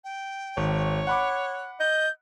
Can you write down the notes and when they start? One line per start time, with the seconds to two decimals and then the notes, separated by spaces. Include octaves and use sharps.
0.04 G5
0.57 G#1 C#5
1.07 F#5 B5 D6 F#6
1.80 D#5 G6